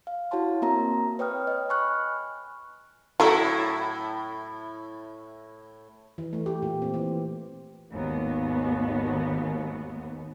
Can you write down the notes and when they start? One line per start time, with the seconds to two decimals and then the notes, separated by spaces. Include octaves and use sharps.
0.07 F5
0.31 E4 F#4 C#5 F5 A5 C6
0.62 A#3 C4 F#4 A#4 E5 A#5
1.19 B4 C#5 G5 D#6 F6
1.47 D#5
1.69 G#5 B5 C#6 F6 F#6
3.20 A2 F#3 A3 E4
6.18 E3
6.33 A3
6.46 G4
6.62 A#2
6.82 C4
6.94 E3
7.91 G#1 D#2 B3